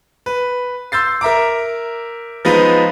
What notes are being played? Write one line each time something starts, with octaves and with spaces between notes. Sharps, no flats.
B4
C6 E6 G6 A6 C7
A#4 E5 A#5 D6
F3 G#3 B3 D#4 F4 B4